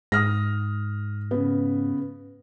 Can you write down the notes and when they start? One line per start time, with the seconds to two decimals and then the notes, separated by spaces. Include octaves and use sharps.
0.12 G#2 D#6 F6 A#6
1.31 C#3 B3